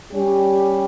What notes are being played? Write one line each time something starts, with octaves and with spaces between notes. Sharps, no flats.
G3 C#4 G4